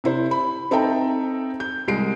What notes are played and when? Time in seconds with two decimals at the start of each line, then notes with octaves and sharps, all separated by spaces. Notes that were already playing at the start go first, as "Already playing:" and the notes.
0.04 C3 E4 C5
0.31 B5
0.71 C4 D#4 A4 E5 G5 A#5
1.60 G6
1.88 C2 G#3 C7 D7